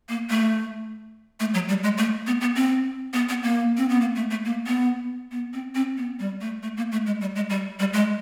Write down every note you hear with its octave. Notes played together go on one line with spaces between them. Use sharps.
A#3
A3
A3
F#3
G3
G#3
A3
B3
B3
C4
B3
B3
A#3
C4
B3
A#3
A3
A3
A#3
B3
B3
C4
C4
B3
G3
A3
A3
A#3
A3
G#3
G3
G#3
G3
G3
G#3